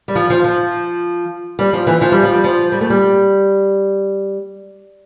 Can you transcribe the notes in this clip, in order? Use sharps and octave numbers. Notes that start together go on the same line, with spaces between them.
G3
F3
F3
F3
G3
F3
E3
F3
G3
F3
G3
F3
G3
A3
G3